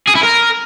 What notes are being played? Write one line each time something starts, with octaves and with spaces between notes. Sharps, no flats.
G#4
E4
A#4